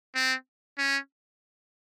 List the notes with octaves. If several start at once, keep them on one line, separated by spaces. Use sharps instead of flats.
C4
C#4